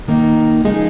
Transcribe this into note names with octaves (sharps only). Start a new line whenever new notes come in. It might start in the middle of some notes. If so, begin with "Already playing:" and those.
D#3 A#3 D#4
C#3 F3 G#3 D#4 G#4